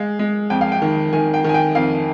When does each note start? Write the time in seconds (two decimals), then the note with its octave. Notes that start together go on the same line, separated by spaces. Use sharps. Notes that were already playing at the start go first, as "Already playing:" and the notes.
Already playing: G#3 F5
0.19 G#3
0.50 F2 G5
0.61 F5
0.72 G5
0.82 D#3
1.13 D#3 G#5
1.34 G5
1.44 D#3 G#5
1.54 G5
1.75 F2 F5